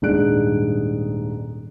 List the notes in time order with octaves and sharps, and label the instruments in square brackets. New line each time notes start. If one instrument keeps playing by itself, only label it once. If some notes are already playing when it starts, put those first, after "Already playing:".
[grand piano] D#1 G#2 D4 G#4 F#6 D7